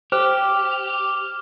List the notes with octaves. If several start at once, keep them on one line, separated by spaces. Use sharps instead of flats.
G4 C5 D6 F6